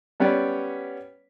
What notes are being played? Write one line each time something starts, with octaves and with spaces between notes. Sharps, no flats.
G3 B3 C#4 B4 D5